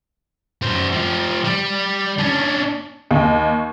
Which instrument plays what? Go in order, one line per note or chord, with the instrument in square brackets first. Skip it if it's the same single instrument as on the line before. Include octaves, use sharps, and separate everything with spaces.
[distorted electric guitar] F#2 C5
F3 G4
G3
C#4 D4
[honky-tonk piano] D#2